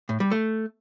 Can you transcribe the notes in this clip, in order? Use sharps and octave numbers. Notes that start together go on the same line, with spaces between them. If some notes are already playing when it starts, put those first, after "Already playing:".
A2
G3
A3